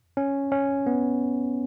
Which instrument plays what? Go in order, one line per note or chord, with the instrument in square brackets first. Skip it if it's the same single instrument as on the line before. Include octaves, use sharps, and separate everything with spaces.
[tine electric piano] C#4
C#4
B3